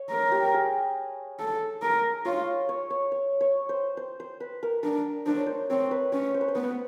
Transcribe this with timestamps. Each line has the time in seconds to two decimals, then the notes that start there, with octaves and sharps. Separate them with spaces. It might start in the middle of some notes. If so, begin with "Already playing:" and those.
Already playing: C#5
0.11 A#4
0.32 G4
0.54 G#4
1.40 A4
1.82 A#4
2.25 F4 C#5
2.69 C#5
2.90 C#5
3.12 C#5
3.41 C#5
3.69 C5
3.97 C5
4.20 C5
4.40 B4
4.63 A#4
4.83 D4 A#4
5.26 D4 C5
5.36 C#5
5.46 C5
5.70 C4 C#5
5.91 B4
6.12 C#4 C#5
6.34 C5
6.41 B4
6.48 C5
6.55 B3 B4